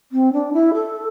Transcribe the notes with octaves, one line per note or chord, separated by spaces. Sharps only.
C4
D4
E4
A4